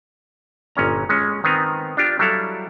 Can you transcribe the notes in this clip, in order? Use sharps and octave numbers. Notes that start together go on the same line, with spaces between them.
G1 A#2 C#4 A#5
G#3 C#4
D#3 B3 C4 G#5 A#5
D4 F4 G4
F#3 G3 E4 A4 F5